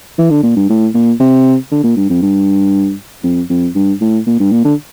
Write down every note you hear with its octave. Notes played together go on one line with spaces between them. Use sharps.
E3
D3
A#2
G2
A2
A#2
C3
D3
A#2
G2
F2
G2
F2
F2
G2
A2
A#2
G2
A#2
D3